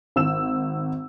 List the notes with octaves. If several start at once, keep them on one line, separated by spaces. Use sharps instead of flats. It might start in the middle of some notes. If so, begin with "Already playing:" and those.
G#1 E6 E7